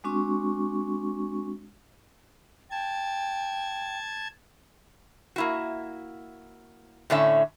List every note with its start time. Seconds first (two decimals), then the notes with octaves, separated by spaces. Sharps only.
0.04 G#3 C4 D4 F#4 C#6
2.71 G5 A5 G#6
5.36 A#3 E4 F#4
7.10 A2 D3 C#4 E5